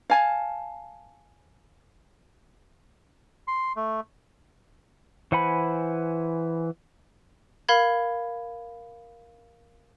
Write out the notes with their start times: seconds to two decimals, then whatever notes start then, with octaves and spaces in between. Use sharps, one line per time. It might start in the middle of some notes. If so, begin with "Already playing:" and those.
0.10 F5 G#5 A5
3.47 C6
3.76 A3
5.32 E3 C5 F#5 G#5 B5
7.69 A#4 F5 B5 G#6